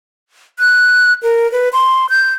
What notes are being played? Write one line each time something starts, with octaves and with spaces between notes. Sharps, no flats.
F#6
A#4
B4
C6
G6